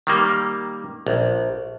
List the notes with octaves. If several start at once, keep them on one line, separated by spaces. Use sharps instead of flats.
D#3 G3 A#3
A#1